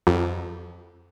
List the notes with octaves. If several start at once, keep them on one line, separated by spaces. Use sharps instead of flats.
F2